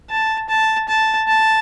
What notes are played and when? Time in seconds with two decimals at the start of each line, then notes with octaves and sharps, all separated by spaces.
0.10 A5
0.49 A5
0.89 A5
1.28 A5